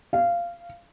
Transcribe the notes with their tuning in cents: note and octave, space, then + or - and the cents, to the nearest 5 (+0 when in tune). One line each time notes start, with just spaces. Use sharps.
F5 -15